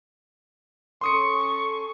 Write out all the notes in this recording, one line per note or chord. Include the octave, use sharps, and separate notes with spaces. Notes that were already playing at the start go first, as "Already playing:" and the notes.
C#4 A4 C6 C#6 D#6 C#7